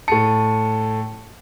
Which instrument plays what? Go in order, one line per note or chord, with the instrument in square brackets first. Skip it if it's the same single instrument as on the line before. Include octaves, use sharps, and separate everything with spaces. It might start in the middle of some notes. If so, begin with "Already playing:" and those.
[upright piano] A2 C#7 [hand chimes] A5